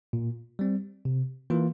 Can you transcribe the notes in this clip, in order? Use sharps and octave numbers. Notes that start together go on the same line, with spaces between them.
A#2
G3 C4
C3
E3 A#3 F4